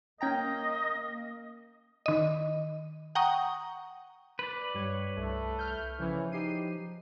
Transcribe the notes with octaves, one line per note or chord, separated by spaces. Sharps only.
A#3 C#4 D#5 G5 A#5
D#3 D#5
F#5 G5 A#5 C#6 D#6
B4 D5
G2 G3 C#5
C2 A3
F6 G6
C#3 E3 F3 C#4 C#5
D#4 G4 C7 D#7